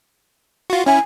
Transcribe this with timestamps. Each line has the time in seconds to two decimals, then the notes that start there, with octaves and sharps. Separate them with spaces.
0.70 F4 F#4
0.86 C#4 E4 G#5